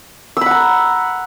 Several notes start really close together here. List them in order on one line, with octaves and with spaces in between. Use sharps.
E6 B5 F#5 A#5